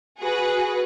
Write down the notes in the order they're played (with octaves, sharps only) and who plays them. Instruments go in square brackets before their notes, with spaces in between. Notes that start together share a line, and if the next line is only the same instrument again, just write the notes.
[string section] F#4 G#4 B4